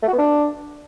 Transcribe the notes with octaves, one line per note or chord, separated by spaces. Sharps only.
A3
F#4
B3
D4